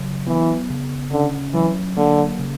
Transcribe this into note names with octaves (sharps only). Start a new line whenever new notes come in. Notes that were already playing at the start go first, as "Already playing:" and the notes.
Already playing: C#3 F#3
E3 B3
C#3
D3 C#4
E3 F#3
D3 A#3
C#3